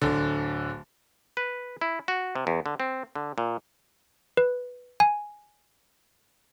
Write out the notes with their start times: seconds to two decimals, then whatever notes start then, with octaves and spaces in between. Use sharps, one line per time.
0.02 D1 D3
1.37 B4
1.81 E4
2.08 F#4
2.36 C3
2.47 E2
2.66 D3
2.80 C4
3.16 D3
3.38 A#2
4.37 B4
5.00 G#5